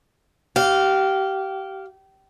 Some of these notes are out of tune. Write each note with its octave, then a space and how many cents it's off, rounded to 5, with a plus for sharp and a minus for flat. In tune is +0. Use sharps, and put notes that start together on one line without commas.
G4 -25 F5 +0